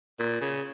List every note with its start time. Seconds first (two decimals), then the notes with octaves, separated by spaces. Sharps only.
0.19 A#2
0.41 C#3